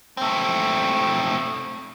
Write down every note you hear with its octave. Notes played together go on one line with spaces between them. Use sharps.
A3 C4